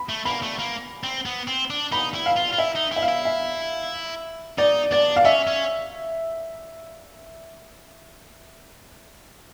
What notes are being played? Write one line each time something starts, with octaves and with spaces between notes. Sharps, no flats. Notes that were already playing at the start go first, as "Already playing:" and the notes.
Already playing: B5
A3
A#3 B5
A3
A#3
C4
B3
C4
D4
D#4 B5
E4
F5
F4
F4
E4 E5
D#4
E4 E5
F5
E4
E5
D#4 D5
D4 D5
F5
C#4 E5
C#4